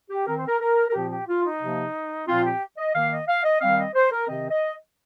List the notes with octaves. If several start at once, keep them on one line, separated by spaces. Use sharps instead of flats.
G4
D#3 C4 A#4
C5
A#4
A#4
A#4
A#2 F3 C4 G4
G4
F4
D#4
C3 F3 A#3
A#2 F3 C4 F4
G4
D#5
D#3 A#3 F5
D#5
F5
D#5
D#3 G3 C4 F5
D#5
C5
A#4
C3 D#3 C4 D#5
D#5